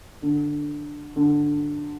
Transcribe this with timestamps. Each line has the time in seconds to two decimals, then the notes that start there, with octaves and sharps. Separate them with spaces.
0.22 D3
1.16 D3